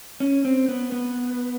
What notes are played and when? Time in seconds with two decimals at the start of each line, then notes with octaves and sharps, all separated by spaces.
0.20 C#4
0.45 C4
0.68 B3
0.92 B3